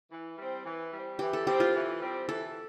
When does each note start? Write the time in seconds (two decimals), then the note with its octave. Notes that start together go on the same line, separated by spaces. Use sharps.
0.11 E3
0.38 G3 C4
0.65 E3
0.92 G3 C4
1.19 E3 G4
1.33 A4
1.47 G3 C4 G4
1.60 F4
1.74 E3
2.01 G3 C4
2.28 E3 A4